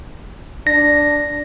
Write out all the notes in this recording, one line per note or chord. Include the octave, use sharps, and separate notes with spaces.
D4 A#6